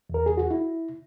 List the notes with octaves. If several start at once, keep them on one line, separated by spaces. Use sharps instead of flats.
E2 A#4
G#4
F#4
E4